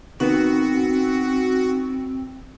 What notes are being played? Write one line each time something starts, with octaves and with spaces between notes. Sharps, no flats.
D#3 B3 C4 F#4